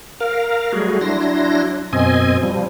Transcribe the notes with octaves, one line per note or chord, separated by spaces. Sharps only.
A#4 F5
F#3 G3 A3 F#4 G#4
F#3 D4 E4 C6 A#6
F#2 B2 C4 D#5 G#5
F3 G3